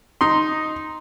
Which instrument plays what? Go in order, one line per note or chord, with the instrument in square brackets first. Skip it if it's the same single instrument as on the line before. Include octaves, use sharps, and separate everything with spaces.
[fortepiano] D#4 C6